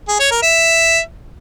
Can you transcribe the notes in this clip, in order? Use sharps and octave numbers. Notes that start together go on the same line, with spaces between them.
G#4
C#5
A#4
E5